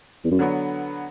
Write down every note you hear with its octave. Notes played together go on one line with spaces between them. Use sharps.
E2
F#2
D3 F#3 B3